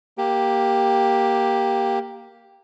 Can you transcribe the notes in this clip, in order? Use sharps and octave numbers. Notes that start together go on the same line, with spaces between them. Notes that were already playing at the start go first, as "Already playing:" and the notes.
A#3 G4